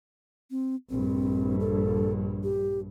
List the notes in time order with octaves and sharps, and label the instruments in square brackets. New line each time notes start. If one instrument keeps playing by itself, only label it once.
[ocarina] C4
[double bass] A#1 G2 [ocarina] C4
[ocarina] A4
G4